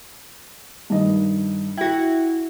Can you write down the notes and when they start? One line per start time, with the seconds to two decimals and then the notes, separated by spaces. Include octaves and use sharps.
0.90 G2 D#3 D#5
1.77 E4 F#4 G5